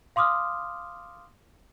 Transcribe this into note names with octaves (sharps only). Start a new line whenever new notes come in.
F5 C6 D6 D#6 F6